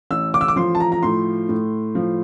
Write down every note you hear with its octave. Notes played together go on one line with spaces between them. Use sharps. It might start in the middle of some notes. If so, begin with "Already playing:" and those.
A1 E6
D6
E6
D6
F3 C6
A5
A#5
A#5
A2 C6
A2
F3